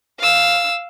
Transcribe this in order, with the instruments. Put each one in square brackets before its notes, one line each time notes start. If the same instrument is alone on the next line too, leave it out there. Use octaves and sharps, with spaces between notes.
[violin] F5 E6